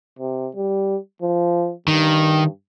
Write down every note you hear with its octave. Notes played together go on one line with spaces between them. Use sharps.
C3
G3
F3
G2 D#3